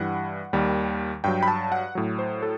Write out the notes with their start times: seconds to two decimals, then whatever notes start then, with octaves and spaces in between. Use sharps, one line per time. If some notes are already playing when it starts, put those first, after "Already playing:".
Already playing: G2 E3 G3 F#5
0.53 D#2 D#3 G3
1.24 G2 F#3 G5
1.43 B5
1.48 A5
1.72 F#5
1.95 A2 F#3
2.19 C5
2.42 A4